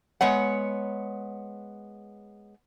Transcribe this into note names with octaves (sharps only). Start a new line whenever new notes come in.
G#3 B3 C#5 F#5